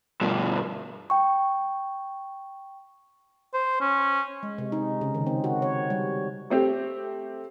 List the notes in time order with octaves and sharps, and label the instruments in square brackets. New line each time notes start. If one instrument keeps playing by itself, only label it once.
[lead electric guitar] G2 B2
[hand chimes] G5 C#6
[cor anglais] C5
C#4
[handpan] G#3
C3
D#4
C#3
D#3
C4
F#4
C#5
G3
[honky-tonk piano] A3 C4 G4